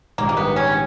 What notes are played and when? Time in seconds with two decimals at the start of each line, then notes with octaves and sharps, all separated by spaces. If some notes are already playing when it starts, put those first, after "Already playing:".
0.18 A#1 G#2 D#3 G3 A#3
0.29 A#3
0.37 B3
0.56 C#4